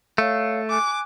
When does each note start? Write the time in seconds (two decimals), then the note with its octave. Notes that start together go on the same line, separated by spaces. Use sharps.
0.18 A3 C#5 F5
0.70 G#5 D6 F#6